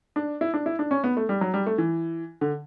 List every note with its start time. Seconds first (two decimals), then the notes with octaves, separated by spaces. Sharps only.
0.16 D4
0.41 E4
0.54 D4
0.66 E4
0.79 D4
0.91 C#4
1.04 B3
1.17 A3
1.29 G3
1.41 F#3
1.54 G3
1.67 A3
1.78 E3
2.41 D3